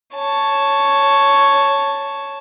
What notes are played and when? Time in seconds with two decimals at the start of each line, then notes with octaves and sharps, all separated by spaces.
0.15 C#5 A5